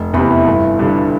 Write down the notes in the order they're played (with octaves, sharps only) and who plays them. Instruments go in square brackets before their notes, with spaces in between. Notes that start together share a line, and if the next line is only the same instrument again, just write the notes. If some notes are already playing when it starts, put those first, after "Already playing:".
Already playing: [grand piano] F1
[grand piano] E2 C3 [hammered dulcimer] E4
[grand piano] G1
G2 D3